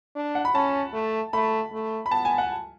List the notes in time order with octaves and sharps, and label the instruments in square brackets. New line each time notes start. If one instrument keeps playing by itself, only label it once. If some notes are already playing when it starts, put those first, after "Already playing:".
[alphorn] D4
[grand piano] F#5
B5
[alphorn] C#4 [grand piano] A5
[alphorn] A3
[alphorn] A3 [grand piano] B5
[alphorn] A3
[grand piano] B5
[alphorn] B3 [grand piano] A5
[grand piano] G#5
F#5